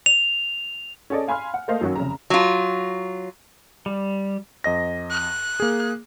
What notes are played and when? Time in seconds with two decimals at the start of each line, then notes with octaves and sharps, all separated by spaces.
0.06 F7
1.10 C#4 G#4 A4 D5 D#5
1.28 F5 G#5 B5 C6 F6
1.54 F#5
1.68 A3 A#3 A4 C5 D#5 F5
1.81 F#2 D#3 F#3 C#4 F#4
1.95 F1 C#3 A#5
2.30 F#3 F4
3.86 G3
4.64 F2 D#5 A#6
5.11 F#6
5.60 A#3 G#4